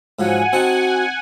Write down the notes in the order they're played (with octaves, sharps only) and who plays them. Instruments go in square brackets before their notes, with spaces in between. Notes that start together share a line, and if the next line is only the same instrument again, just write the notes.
[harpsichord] G#2 F3 F#3 [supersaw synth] F#5 G#5
[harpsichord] C4 D#4 A5 [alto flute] F#4